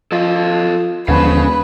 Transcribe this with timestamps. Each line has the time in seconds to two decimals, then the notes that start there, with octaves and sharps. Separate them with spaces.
0.12 F3 A4 D#5 F5
1.08 E1 D#2 D3 F3 C#4 B4 F5